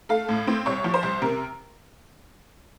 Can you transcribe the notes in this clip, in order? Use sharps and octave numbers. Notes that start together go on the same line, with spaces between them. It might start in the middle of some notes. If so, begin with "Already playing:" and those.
A3 F5
A2
C4
C2 C#5
F3
C5
C2
C3 A#4